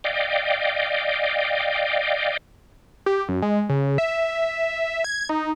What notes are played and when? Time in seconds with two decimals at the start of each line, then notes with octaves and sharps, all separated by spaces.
0.04 D5 D#5 F5 G5
3.06 G4
3.29 F#2
3.42 G#3
3.69 C#3
3.98 E5
5.04 G#6
5.29 D#4